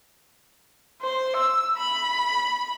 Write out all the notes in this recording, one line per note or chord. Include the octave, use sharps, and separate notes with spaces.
C5
E6
B5